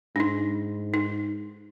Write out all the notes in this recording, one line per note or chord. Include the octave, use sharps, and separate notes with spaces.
G#2 D4 D#4
D#4